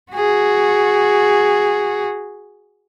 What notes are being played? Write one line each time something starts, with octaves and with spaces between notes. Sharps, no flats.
F#4 G#4